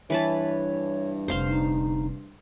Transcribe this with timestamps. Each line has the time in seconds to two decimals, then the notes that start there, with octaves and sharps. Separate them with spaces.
0.10 G2 E3 B4 C#5 A5
1.28 F1 D3 C5 F5 C6
1.49 D#4